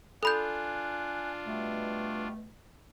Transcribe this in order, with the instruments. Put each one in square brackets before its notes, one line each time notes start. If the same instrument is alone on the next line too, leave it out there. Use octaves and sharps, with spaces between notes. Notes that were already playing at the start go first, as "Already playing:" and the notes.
[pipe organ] D4 F4 [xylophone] A4 B5 G6 [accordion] G#5 F#6
[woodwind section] B2 A3 [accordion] G3